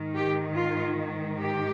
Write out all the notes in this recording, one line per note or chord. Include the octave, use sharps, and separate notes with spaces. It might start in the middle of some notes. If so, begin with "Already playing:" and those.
Already playing: G#2 D#3
G4
F4
G4